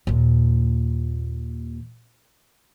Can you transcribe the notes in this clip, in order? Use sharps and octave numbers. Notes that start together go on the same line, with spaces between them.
D#2 A#2